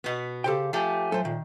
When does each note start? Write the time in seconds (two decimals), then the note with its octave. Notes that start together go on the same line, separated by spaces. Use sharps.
0.04 B2 B3
0.44 C#3 G4 A4 C5 G5
0.73 F3 A3 G4 G#5
1.12 F#3 A4 C5
1.25 A#2 D#3